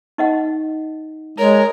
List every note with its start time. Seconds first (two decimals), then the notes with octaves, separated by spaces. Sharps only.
0.18 D#4 D#5 F#5
1.38 G#3 A#4 C#5